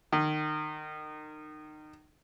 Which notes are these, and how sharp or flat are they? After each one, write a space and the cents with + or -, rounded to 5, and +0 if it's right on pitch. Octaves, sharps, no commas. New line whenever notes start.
D#3 -25